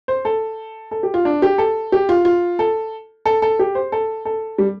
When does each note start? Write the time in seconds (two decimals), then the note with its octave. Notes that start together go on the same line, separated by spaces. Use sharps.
0.08 C5
0.25 A4
0.91 A4
1.03 G4
1.14 F4
1.25 D4
1.42 G4
1.58 A4
1.92 G4
2.09 F4
2.25 F4
2.59 A4
3.25 A4
3.42 A4
3.59 G4
3.75 C5
3.92 A4
4.25 A4
4.58 G3